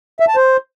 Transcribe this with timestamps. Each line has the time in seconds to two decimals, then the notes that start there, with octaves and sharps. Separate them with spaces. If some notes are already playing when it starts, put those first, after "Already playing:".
0.20 E5
0.28 A5
0.36 C5